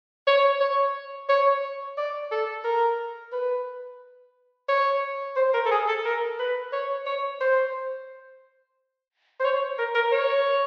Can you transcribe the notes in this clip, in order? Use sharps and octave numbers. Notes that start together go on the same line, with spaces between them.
C#5
C#5
C#5
D5
A4
A#4
B4
C#5
C5
A#4
A4
G#4
A4
A#4
B4
C#5
C#5
C5
C5
C#5
A#4
A#4
C#5